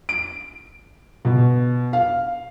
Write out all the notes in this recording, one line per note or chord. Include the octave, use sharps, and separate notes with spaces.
D7
B2
F5